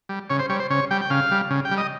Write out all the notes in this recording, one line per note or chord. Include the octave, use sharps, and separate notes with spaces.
G3
C#3 C#5
C5
G3 C#5
C5
C#3 C#5
G3 G5
G5
C#3 F5
G3
C#3
G5
G3
D#5